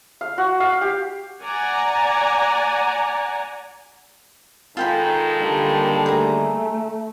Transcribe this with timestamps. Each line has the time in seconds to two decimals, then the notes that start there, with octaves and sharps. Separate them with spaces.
0.21 F5
0.38 F#4
0.60 F5
0.81 G4
1.43 D5 F#5 G#5 A#5
4.77 G#2 D#3 F4 A4 G5 B5
5.38 D3 G3 A#3 A5
6.06 A3 G#4 A#5